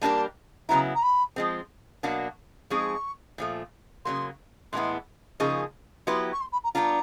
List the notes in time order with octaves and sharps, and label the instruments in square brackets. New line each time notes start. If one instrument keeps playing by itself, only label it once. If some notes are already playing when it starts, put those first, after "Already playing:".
[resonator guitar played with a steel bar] G3 A#3 D4 G4 A#4 [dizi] A5
[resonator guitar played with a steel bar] C#3 F#3 B3 E4 [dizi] A#5
[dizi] A#5
B5
[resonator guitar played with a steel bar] F3 G#3 C4
B2 F#3 A#3 D4 F#4
[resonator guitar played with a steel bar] F3 G#3 C4 D#4 G#4 [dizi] C#6
[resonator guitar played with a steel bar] A#2 F3 A3
[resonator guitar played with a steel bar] C#3 F#3 A#3 [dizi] C6
[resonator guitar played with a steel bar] A2 E3 G#3 B3 E4 [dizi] C6
[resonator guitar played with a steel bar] C#3 F3 A#3 D#4 G#4 [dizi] C#6
[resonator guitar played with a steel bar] F#3 B3 E4 G4 B4 [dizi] C6
[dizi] C#6
C6
B5
A#5
[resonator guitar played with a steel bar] G3 B3 D4 F4 [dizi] A#5